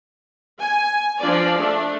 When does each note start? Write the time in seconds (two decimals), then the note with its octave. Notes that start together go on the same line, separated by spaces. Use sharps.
0.60 G#5
1.20 F3 D4 D5
1.57 A3 D4